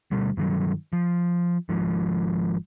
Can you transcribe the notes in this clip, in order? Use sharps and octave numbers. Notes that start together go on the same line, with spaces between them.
D2 B2 G3
G2 D#3 E3 F#3
F3
G#1 G#2 F3